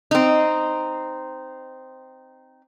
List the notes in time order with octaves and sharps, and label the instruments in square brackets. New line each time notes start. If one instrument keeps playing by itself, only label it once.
[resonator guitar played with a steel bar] C4 D#4